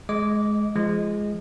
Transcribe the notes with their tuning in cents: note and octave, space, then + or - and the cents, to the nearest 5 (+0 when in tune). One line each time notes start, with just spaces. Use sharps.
G#3 +20 D#5 -10 D6 -15
F3 -25 G#3 +0